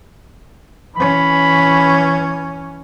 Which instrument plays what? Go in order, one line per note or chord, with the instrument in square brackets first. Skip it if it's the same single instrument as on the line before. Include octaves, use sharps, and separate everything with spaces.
[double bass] E3 C#4 [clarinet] B5